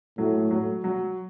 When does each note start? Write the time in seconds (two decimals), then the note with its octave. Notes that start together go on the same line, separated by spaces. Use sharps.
0.18 A2 F#3
0.51 F#3
0.84 F#3